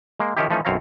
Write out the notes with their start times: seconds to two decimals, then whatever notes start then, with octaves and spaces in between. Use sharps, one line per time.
0.20 G#3 A#3
0.37 D#3 F3 C#4 D#4 E4 G4
0.50 E3 F3 A3 C#4 D#4
0.65 B1 F#2 C4 C#5 F5 A#5